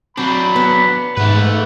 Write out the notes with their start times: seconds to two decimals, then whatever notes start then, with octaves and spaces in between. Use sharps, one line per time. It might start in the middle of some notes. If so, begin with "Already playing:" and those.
0.17 F#3 C4 D4 B5
0.56 B3
1.17 G#2 A3 B4 F#5